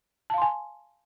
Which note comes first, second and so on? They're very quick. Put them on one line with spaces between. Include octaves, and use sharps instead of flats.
A5 F5 C6 G#5